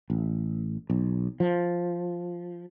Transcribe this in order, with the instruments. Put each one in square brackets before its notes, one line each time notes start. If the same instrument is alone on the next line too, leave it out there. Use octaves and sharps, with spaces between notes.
[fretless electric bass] A1
B1
F3